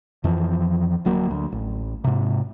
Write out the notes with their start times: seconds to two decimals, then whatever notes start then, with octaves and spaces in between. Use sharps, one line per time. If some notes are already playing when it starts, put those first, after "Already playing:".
0.24 F2 E3 F3
1.05 D1 F#3 A#3
1.31 D2
1.52 A1
2.04 G#2 C3